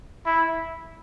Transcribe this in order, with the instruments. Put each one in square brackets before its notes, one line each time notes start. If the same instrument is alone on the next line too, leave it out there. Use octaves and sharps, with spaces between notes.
[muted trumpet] E4